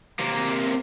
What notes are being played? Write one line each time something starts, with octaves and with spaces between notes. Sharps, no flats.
C3 A#3